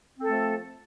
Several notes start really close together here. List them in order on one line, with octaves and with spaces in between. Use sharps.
C4 A4 A3 F3